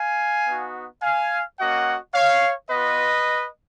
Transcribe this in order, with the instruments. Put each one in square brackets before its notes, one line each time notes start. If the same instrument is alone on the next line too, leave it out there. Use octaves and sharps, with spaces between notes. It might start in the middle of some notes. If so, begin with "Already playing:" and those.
Already playing: [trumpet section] F5 G#5
B3 D#4 F#4
F5 G#5
A#3 C#4 F#4 D#5 F#5
C#5 F5
B3 F4 B4 D#5